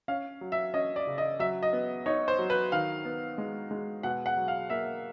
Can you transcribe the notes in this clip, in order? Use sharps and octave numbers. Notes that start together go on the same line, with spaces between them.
C#4 F5
F#3
E5
C#4 D#5
D5
C#3
D#5
F#3 E5
D#5
B3
D#4 C#5
C5
F#3
B4
D#3 F5
B3
G#3
G#3
B2 F#5
F#5
F#3
F5
A#3 E5